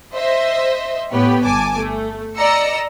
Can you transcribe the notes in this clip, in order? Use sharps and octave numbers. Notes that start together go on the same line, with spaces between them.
C5 D#5 E5
A2 B3 G4 B4 C#5
G1 G#5 A5 D6
A3
D5 D#5 A#5 E6 C#7